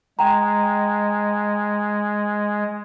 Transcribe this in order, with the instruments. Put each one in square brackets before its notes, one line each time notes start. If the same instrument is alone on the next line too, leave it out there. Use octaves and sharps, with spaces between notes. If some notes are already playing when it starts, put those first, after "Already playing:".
[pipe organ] G#3 [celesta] G5 A#5